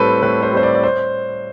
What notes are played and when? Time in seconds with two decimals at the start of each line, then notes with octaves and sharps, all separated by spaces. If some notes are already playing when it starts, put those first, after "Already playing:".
Already playing: A2 G3 C4 A4 B4
0.22 A2 B4
0.42 C5
0.53 G3 C4 C5
0.63 D5
0.75 D5
0.83 C5